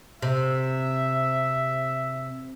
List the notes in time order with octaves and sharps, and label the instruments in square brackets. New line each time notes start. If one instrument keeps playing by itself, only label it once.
[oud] C3 [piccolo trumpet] E5